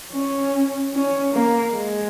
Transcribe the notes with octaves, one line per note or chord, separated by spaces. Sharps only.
C#4
C#4
A#3
G#3